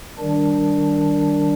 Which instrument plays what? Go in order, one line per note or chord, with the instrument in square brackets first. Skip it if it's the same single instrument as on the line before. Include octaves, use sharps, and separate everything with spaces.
[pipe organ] D#3 G3 D4